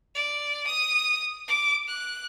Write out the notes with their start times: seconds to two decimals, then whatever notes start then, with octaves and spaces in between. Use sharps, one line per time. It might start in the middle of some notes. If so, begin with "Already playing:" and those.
0.14 D5
0.66 D#6
1.48 D6
1.87 F#6